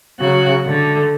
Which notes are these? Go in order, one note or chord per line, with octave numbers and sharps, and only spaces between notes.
C#3 F#3 F#4 F#6
D3 A3